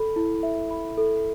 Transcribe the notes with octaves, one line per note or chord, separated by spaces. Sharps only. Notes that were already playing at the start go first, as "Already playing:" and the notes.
Already playing: A4 B5
E4
E5
B5
A4